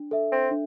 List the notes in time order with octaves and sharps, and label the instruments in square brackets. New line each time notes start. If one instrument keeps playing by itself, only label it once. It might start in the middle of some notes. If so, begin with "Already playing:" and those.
Already playing: [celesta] D4
A4 E5
[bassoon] C4
[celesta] D4